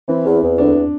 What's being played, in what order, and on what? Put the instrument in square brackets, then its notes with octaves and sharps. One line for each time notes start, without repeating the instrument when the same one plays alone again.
[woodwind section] E3 [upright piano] C4
[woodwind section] E2
E2
[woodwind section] D2 [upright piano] D4